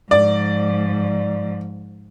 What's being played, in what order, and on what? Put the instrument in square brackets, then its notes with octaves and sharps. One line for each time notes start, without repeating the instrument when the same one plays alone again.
[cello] G#2 F3 [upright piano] D5